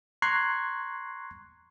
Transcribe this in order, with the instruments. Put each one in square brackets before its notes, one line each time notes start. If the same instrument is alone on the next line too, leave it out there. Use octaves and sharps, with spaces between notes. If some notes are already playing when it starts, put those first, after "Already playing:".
[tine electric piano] A#5 C6 C#6 F#6 G#6 C7